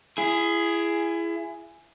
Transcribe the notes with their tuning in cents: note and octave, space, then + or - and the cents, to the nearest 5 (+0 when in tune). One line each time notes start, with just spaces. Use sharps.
E4 +30 G#4 +0